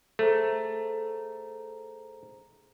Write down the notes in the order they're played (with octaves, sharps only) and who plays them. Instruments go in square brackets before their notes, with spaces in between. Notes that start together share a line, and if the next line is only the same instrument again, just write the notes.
[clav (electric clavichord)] A3 [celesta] G#4 C5 A#5